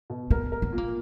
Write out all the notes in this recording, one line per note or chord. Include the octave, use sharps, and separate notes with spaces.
B2
B3 A#4
A#4
B3
A#2
A#3